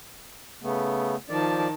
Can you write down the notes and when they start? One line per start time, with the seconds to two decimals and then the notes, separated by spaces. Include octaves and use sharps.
0.62 C#3 A3 B3
1.29 D#3 F3 D5 A5